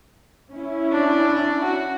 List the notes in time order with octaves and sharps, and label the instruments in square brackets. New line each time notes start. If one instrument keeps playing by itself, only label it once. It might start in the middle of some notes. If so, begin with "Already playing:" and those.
[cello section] C#4 E4
[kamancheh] D4
F#4